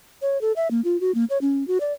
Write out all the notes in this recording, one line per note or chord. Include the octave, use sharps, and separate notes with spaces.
C#5
A4
E5
A#3
F4
F#4
A#3
C#5
C#4
F#4
D5